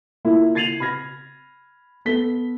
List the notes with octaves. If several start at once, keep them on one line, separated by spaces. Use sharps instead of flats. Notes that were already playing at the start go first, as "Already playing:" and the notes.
A#3 E4 F4
G#6 A6 C7 D#7 F7 F#7
B5 F6 G#6 A#6
B3 A4 B6 G7